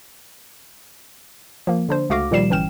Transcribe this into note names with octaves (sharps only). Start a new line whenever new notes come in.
F3 A#3
D3 D4 C5
C#2 A3 F#4 F5 D6 A#6
A#2 D#3 F3 G3 C7 E7
G1 E3 C#4 G5 F6 E7